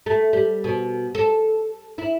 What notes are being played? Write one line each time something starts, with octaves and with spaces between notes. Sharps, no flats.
A3
G3
B2
A4
E4